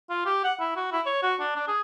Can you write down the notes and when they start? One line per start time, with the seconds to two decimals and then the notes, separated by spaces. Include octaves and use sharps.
0.10 F4
0.26 G4
0.44 F#5
0.60 E4
0.76 F#4
0.92 E4
1.06 C#5
1.22 F#4
1.40 D4
1.56 D4
1.67 G#4